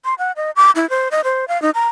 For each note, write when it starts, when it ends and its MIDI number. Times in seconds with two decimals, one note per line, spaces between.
0.05 0.14 84
0.19 0.32 78
0.36 0.51 75
0.56 0.71 86
0.76 0.88 64
0.90 1.08 72
1.11 1.21 75
1.24 1.45 72
1.48 1.60 77
1.62 1.70 63
1.75 1.89 82